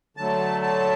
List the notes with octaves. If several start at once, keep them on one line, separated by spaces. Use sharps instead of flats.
D3 F#3 A3 A5
A5